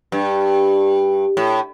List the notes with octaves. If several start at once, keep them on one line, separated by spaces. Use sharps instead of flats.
G2
A2